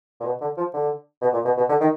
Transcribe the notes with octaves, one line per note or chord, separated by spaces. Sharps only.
A#2
B2
D3
F3
D3
B2
A#2
B2
B2
D3
D#3